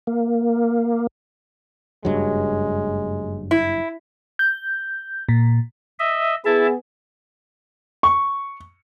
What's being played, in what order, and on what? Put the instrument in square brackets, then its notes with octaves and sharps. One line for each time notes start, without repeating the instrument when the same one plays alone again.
[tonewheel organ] A#3
[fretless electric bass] F#1 G2 F#3 [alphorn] G#3
[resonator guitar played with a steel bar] E4
[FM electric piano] G6
A#2
[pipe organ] D#5 E5
[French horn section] B3 G#4 [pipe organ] E4 E5 A5
[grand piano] C#6